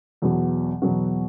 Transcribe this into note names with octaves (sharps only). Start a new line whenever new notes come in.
E2 B2 F#3 B3 F#4
E2 B2 F#3 B3 F#4